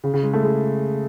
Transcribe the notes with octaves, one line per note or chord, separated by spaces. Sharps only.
C#3
C#3
G#3
A3
G#3